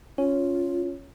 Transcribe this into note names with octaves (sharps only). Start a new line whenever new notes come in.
C#4 F4